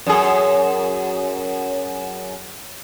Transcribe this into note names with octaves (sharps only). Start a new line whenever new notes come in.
F#2 G#4